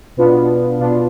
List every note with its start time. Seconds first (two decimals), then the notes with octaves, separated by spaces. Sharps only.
0.17 B2 B3 D4 F4
0.80 B2 B3 D4 F4